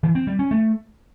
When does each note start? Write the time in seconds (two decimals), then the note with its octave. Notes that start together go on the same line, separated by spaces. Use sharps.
0.03 E3
0.15 C4
0.27 G3
0.39 C#4
0.51 A3